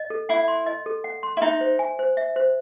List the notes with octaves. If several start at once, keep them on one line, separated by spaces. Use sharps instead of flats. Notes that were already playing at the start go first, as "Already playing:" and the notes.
Already playing: D#5
A4
E4 F#5
C6
D#5
A4
F#5
C6
E4
D#4 E5
C5
G#5
C5
E5
C5